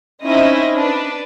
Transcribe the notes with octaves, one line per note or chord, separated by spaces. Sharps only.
C4 C#4 D#4 E4 D#5
D4 B4